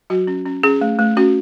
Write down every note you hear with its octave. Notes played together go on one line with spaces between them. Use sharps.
F#3 F#4
C#4
C#4
C#4 G#4
A3
A3
C#4 F#4